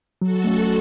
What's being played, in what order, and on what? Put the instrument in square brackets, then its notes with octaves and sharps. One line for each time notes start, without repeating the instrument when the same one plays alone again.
[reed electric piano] F#3 [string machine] F#4 A4
[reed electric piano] A3 C#4